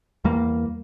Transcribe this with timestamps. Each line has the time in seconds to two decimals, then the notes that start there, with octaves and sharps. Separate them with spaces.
0.25 E2 G3 A#3